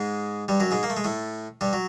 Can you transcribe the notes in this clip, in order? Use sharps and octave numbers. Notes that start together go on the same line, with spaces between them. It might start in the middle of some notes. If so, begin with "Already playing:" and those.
Already playing: G#2 G#3
G2 G3
F#2 F#3
G#2 G#3
A#3
A3
G#3
A2 A3
G2 G3
F#3